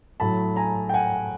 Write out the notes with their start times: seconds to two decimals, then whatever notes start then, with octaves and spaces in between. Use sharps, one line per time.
0.20 A2 F#3 A3 A5 B5
0.56 G#5 A#5
0.89 G5
0.94 F#5 G#5